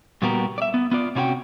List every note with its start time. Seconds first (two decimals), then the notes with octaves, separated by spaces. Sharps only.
0.22 A#2 G3 B3 F#4 G4 A#4
0.58 D5 E5
0.74 B3
0.91 B3 F4 D5
1.15 C3 C#4 F#4 A#4 G5